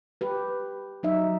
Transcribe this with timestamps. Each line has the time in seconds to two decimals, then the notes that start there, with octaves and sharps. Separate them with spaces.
0.21 G4 B4
1.03 F#3 D#4 E5